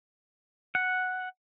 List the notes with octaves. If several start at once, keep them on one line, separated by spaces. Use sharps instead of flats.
F#5